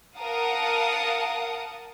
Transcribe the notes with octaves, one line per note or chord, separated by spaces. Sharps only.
A#4 F5 F#5 A5 D#6